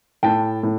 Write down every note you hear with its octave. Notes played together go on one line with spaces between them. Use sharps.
A2 G5 A5
A2